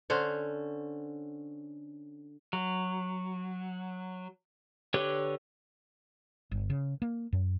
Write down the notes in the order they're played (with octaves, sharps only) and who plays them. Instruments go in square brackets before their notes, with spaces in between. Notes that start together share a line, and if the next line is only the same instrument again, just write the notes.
[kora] D3 C#4 C5
[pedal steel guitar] F#3
D3 G4 B4 C#5
[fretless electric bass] G1
C#3
A#3
F#2